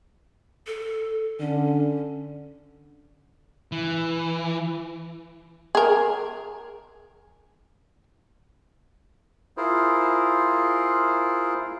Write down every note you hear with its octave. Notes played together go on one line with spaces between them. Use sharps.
A4
D3 C#4
E3
G#4 A#4
E4 F4 G#4 A#4 C5